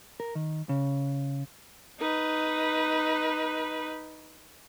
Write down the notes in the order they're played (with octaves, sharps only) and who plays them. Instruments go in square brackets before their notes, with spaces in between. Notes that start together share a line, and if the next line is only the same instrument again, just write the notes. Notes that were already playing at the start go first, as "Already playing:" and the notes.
[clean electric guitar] A#4
D#3
C#3
[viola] D#4 B4